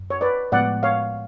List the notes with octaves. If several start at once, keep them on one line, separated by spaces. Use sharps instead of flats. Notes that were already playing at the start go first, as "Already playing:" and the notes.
Already playing: F#2
C#5
B4 D5
A2 F3 G#3 B3 D5 F#5
C#5 F5